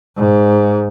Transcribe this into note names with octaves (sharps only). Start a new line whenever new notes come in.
G#2